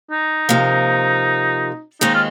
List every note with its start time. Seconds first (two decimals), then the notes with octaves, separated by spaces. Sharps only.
0.11 D#4
0.49 C3 F3 A#3
2.01 D#2 D#3 G#3 C4 D#4
2.14 F4